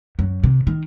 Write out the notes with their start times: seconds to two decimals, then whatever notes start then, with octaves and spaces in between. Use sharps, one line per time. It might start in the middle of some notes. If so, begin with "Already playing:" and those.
0.19 F#2
0.44 C3
0.67 D#3